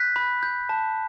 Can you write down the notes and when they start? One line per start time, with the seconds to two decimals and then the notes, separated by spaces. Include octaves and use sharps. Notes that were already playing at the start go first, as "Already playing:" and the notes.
Already playing: F#6 G6 B6
0.16 B5
0.43 G6
0.69 A5